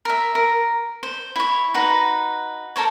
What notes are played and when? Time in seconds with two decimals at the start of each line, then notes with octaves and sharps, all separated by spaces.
0.05 A#4 E5
0.35 A#4
1.03 C5
1.36 E4 C#5
1.74 D#4 F#4 B4
2.76 A4 A#4 C5 C#5